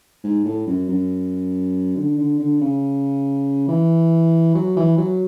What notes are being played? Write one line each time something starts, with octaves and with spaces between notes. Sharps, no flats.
G#2
A2
F#2
F#2
D3
D3
D3
C#3
E3
F#3
E3
F#3